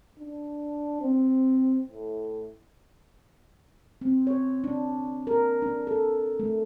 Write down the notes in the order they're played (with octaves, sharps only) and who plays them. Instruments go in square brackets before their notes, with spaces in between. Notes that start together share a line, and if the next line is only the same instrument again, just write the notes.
[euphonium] D4
C4
A2
[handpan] C4
C#5
D4
A#4
D4
A4
A3